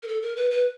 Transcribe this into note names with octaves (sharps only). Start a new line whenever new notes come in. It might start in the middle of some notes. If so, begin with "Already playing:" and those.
A#4
A4
A#4
B4
B4